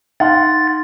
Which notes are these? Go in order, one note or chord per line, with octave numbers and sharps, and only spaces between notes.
D#4 F5 F#5 C6 A6